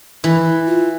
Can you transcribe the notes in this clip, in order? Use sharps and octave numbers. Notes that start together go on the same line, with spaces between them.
E3 E4
F4